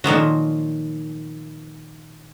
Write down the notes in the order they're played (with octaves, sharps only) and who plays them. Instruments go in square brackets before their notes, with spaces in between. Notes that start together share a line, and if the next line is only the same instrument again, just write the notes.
[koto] A#2 D#3 F3 F#3